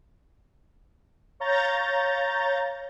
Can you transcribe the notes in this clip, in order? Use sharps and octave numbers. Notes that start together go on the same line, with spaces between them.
C#5 F5 A#5 G6 A6